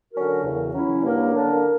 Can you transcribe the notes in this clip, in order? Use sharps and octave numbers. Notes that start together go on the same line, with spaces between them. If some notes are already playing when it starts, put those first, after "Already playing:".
D3 F#3 C#4 F#4 A#4
E2 C#3 E3
F#3 C#4 E4
G2 F#3 A#3 D4 A#4
D3 A#3 D4 A#4